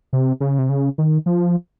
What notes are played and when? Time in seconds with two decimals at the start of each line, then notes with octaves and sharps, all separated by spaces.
0.13 C3
0.40 C#3
0.58 C3
0.69 C#3
0.98 D#3
1.26 F3